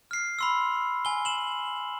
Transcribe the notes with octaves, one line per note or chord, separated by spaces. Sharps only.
F6 C7
B5 C6 E6
G#5 G7
E7 F#7